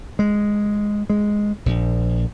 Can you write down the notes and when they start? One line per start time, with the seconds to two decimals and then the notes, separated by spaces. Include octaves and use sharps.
0.19 G#3
1.10 G#3
1.66 A#1